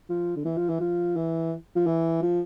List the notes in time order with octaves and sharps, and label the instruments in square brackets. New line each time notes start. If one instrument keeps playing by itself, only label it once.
[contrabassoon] F3
D3
E3
F3
E3
F3
E3
F3
E3
F3